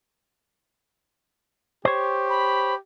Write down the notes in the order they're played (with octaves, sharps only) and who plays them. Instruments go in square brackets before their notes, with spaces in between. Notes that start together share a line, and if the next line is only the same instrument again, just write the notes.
[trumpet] G4 [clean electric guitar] C5 C#5
[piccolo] B5